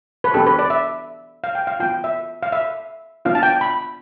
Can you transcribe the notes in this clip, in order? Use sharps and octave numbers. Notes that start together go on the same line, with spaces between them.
B4
B3 D4 G4 A4
B4
D5
E5
F5
G5
F5
B3 F4 G5
E5
F5
E5
B3 D4 F4 F5
A5
G5
B5